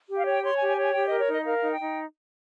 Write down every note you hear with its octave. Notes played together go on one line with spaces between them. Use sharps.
G4
F5
C#5 G5
C#5 C6
G4 G#5
G#5
C#5
G#5
G4 G5
A#4 D#5
C#5
D#4 D#5
A#4 F5
D#4
G5
D#4